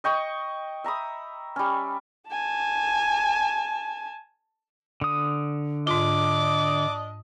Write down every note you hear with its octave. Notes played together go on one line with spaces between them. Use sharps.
D#5 G5 C#6 D#6
E5 A#5 B5 D#6
G3 C#4
G#5 A5
D3 D#6
G#2 D4 F4 D#5 D6